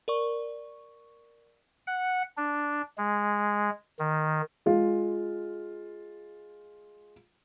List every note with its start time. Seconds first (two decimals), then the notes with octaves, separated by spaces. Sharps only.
0.08 A#4 D5 C#6
1.87 F#5
2.37 D4
2.98 G#3
3.99 D#3
4.66 G#3 F4